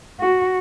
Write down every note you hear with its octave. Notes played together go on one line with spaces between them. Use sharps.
F#4